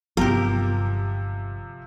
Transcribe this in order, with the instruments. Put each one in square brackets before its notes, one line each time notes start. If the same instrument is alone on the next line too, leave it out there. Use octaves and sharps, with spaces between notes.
[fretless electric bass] G1 F#3 B3 [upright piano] C3 F3 [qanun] G4 A#4